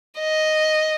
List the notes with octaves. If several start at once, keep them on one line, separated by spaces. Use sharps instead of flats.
D#5